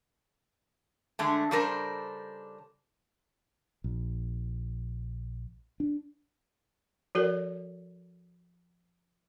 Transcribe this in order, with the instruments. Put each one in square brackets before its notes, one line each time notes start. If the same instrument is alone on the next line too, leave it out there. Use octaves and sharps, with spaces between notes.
[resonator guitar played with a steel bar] D3 G#3 A3
C#3 G3 D4 A4 A#4 C5
[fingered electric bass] A#1
D4
[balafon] F3 F#4 A4 A#4 D5